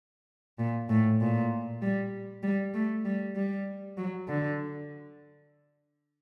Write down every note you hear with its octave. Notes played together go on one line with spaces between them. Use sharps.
A#2
A2
A#2
G3
G3
A3
G3
G3
F#3
D3